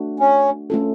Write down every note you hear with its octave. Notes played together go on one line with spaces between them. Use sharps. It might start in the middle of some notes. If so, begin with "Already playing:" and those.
Already playing: A3 D4 F#4
C#4
A3 C#4 F4 A4